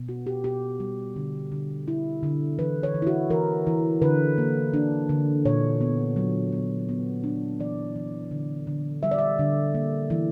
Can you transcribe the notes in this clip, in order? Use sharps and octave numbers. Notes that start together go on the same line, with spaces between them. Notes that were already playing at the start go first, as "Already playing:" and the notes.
Already playing: B2
B3 F#4
G4
B2 G4
G3
D3
D3
E4
D3
E3 B4
C#5
E3
E4
F#4
E3 A#4
E3
D3 B4
A#3
D4
D3
A#2 C#5
B3
F#3
B3
B3
D4
E3 D5
E3
D3
D3
G3 E5
D5
E5
D3
A#3
E3